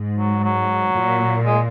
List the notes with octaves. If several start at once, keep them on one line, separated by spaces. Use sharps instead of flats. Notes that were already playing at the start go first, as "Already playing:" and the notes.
Already playing: G#2
F#3
F#3
A#2
G#3